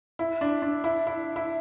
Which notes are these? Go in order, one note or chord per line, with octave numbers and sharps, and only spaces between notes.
E4
D4
D4
E4
E4
E4